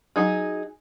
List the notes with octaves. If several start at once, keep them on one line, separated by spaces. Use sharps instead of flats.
F#3 D#4 G#4